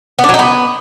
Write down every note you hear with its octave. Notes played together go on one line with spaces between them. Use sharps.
B3
D4
F#3
D#4
B3